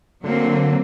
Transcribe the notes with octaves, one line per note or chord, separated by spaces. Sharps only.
D3 F#3 A#3 C4